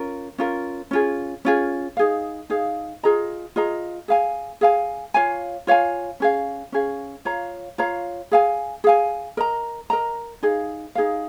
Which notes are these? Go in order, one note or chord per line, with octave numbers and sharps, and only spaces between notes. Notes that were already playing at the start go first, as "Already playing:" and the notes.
Already playing: C#4 F4 A#4
C#4 F4 A#4
C#4 F4 G#4
C#4 F4 G#4
D#4 G#4 F5
D#4 G#4 F5
F4 G#4 D#5 A#5
F4 G#4 D#5 A#5
G#4 F5 G#5
G#4 F5 G#5
F4 C#5 F5 G#5
F4 C#5 F5 G#5
C#4 G#4 F5
C#4 G#4 F5
F4 C#5 F5 A#5
F4 C#5 F5 A#5
G#4 F5 G#5
G#4 F5 G#5
A#4 D#5 A#5
A#4 D#5 A#5
D#4 G#4 F5
D#4 G#4 F5